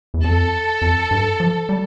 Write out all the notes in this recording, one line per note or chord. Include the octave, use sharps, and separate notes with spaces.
E2
F2 A4
F2
G2
F3
G3